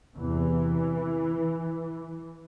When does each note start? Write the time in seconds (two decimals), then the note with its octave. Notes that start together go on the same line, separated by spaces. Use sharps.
0.16 E2 C3 E3